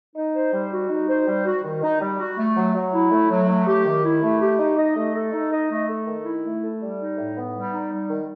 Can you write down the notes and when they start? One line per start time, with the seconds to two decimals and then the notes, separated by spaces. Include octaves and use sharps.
0.15 D#4
0.34 C5
0.53 G3
0.71 F#4
0.89 D#4
1.08 C5
1.27 G3
1.45 F#4
1.64 D#3
1.82 D#4
2.01 G3
2.19 F#4
2.37 A3
2.56 F#3
2.74 F#3
2.93 E4
3.11 A3
3.30 F#3
3.48 A3
3.66 G4
3.85 D#3
4.04 E4
4.22 A3
4.41 G4
4.59 D#4
4.77 D#5
4.96 A3
5.14 A4
5.32 D#4
5.51 D#5
5.70 A3
5.88 A4
6.07 D#3
6.25 E4
6.44 A3
6.62 A4
6.80 G3
6.99 D#4
7.18 A2
7.36 B3
7.55 G3
7.73 D#4
7.91 G3
8.10 D#3